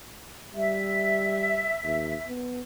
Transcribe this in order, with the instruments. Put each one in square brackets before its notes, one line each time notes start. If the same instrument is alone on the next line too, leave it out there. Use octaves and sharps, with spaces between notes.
[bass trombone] G3 [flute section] E5
[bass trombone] D#2
B3